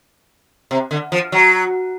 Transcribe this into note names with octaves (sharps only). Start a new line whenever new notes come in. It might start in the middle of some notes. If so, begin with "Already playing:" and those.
C3
D3
F3
F#3